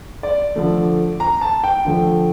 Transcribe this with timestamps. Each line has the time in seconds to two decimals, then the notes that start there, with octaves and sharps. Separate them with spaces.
0.23 D5
0.56 D3 F3 A3
1.20 A#5
1.41 A5
1.64 G5
1.85 D3 F3 A3